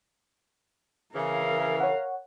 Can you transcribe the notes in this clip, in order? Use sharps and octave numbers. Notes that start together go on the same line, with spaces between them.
C#3 E3 A#4 F5
C#5 F#5